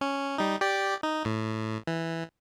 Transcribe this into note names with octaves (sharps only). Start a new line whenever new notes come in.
C#4
G3 D#4
G4 D5
D#4
A2
E3